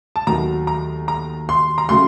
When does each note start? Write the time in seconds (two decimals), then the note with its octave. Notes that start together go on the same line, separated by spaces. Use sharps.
0.16 A5
0.27 D#2 D#3 F#3 A3 A#5
0.67 A#5
1.08 A#5
1.49 C6
1.78 A#5
1.89 C#3 F#3 A3 C6